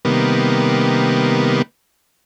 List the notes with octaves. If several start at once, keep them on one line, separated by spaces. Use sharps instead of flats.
C3 D#3 G3 A#3 B3